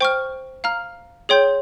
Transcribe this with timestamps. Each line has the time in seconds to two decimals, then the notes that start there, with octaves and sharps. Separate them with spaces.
0.01 C5 G5 C#6 F6
0.64 F5 A#5 F6
1.29 G#4 C#5 G5 C6 G6